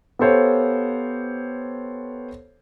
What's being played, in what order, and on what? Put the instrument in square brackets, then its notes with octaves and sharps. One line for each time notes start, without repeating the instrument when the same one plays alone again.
[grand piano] B3 G4 A4 C5 C#5 F5